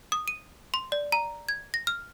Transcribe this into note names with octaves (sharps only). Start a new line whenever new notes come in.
D#6
D#7
C6
D5
A#5
G#6
A#6
F6